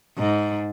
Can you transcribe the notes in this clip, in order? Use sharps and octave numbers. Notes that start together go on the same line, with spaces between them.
G#2